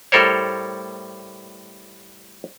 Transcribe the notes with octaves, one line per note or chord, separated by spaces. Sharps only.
A2 G3 A4 A#4 C5 C#5